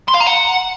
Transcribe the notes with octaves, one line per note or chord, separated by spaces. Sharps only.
C6
F5
A#5
F#5